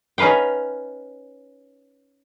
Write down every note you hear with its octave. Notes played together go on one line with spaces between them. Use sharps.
C#4 D#4 B4 F5 G5